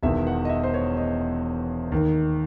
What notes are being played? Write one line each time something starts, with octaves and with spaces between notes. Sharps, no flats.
E1 E2 D#3 E5
F#5
D#5
E5
C5
C#5
D#5
D#2 D#3